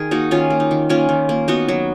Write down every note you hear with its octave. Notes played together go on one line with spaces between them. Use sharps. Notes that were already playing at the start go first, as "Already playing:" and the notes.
Already playing: D#3 G#4 A#4
A#3 D#4 F#4
D#3 C#4 F4
A#3
D#4
D#3
A#3 C#4 F4
D#3
A#3
B3 D#4 F#4
F#3